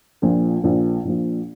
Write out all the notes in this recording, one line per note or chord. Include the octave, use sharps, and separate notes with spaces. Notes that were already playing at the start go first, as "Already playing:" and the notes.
A#1 A#2 F3
A#1 A#2 F3
A#1 A#2 F3